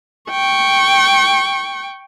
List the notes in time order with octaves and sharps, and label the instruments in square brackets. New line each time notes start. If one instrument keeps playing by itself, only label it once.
[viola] G5 C#6